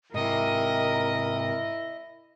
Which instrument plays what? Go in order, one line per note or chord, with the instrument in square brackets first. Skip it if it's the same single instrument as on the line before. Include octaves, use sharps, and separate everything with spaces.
[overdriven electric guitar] G#2 C3 [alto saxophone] E4 [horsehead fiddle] A#4 [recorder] D#5